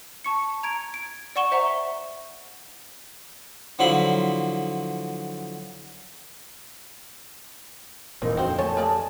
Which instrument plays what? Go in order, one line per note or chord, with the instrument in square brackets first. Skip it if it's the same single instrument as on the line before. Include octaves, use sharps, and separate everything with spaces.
[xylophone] A5 C#6 C#7
A#5 G#6 D7
D7
D5 F#5 C#6 E7 G7
C5 E5 F#5 A#5 C#6
[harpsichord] D3 F3 F#3 E4 B5 C6
[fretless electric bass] D#1 A#2 E3 [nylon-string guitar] B3 D#4 A#4 [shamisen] C4
[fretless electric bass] F2 [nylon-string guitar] D3 G5 [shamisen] C4 F#4 [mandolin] C5
[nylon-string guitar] A3 G#5 [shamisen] C#5 [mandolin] A5
[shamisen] A#4 D5 D#5